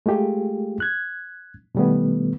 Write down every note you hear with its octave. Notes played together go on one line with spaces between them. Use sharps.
G#3 A3 F4 G4 G#4
F#6 G#6
B2 D#3 G3 A3 B3